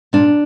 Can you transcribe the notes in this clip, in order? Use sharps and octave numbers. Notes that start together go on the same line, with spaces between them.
A#2 D4